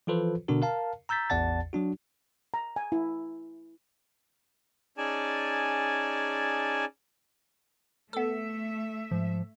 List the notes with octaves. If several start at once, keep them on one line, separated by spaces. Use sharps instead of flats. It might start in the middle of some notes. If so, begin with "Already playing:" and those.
E3 F3 F4 A4 B4 C5
B2 D3 D4 F#4 A#4
A#4 F5 A5
A#5 E6 G6 A6 B6
A1 E2 D5 F#5 A5 A6
F#3 D4 F#4
A#5
G#5
E4
C#4 D#4 G#4 D5 G#5 A5
A3 B3 A4 E5
G#2 F3